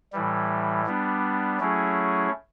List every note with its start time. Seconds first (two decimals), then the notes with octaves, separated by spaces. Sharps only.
0.13 A2 E3 G3
0.86 G3 B3 D4
1.60 F#3 A3 C#4 E4 G#4